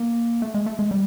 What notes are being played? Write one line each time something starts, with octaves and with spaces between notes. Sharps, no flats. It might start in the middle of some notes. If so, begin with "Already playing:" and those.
Already playing: A#3
A3
G#3
A3
G#3
G3